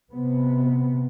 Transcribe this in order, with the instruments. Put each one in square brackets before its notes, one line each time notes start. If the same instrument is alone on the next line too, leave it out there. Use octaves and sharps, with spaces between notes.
[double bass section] C3 B3